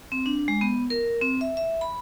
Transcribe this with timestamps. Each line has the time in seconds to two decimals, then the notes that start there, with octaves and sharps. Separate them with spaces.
0.12 C4
0.26 D4
0.48 G#3
0.61 B3
0.90 A#4
1.22 C4
1.41 E5
1.57 E5
1.81 B5